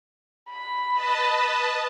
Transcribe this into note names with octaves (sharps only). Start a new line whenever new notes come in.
B5
B4 D#5 A5